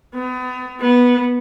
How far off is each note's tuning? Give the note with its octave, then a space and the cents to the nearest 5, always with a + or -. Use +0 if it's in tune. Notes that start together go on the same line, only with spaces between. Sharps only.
B3 +35
B3 -10